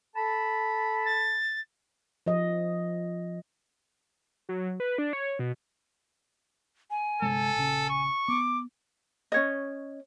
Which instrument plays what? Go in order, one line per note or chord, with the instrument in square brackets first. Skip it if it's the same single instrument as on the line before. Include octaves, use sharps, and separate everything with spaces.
[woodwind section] A4 A5 B5
[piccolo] A6
[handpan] F3 D#5
[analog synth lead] F#3
B4
D4
C#5
B2
[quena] G#5
[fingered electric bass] G1 C3 G#3 [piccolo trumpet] A4
[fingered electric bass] A#1 C#3
[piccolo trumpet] C#6
[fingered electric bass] B3 [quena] D6
[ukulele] C#4 C#5 D#5